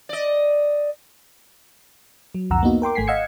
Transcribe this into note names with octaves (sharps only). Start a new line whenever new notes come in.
D5 D#5
F#3
C2 F2 D3 F#5 A#5 E6
A#3 B3 D#4 F#4
A#4 G5 C6 D6
G#1 A3 G#5 B6 C7
D#5 F5 F#5 E6 G#6 C#7